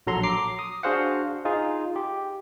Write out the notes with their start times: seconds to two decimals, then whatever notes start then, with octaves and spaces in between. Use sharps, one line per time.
0.07 A#1 F#3 A4 A#5 C6
0.23 A#5 D6 C7
0.59 D#6
0.83 D4 F#4 G#4 C5 F5 F#5
1.45 D#4 F4 G#4
1.96 G4